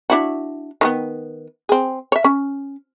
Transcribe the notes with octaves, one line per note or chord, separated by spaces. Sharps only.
D4 E4 F#4
D#3 A3 B3
C4 G#4
C#5 E5
C#4